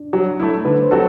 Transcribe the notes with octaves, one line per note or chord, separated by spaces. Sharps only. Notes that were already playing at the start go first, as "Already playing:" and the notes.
Already playing: D4
F#3
A3 E4
D3 B4
C5
F#3 C4 F#4 A4